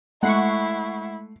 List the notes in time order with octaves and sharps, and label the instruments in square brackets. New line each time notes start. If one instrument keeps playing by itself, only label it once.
[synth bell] G#3 C7 [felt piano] A3 [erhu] E4 [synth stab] F#5 C#6